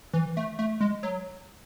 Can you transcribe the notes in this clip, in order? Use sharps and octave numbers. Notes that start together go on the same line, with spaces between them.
E3
A3
A3
G#3
F#3